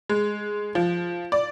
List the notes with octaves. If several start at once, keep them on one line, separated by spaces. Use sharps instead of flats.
G#3
F3
D5